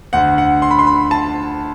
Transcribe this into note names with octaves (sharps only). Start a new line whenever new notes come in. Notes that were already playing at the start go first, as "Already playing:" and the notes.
D2 D3 F#5
F#5
C6
B5
C6
B5
A5